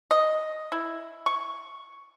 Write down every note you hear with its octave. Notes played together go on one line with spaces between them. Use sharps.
D#5
E4
C#6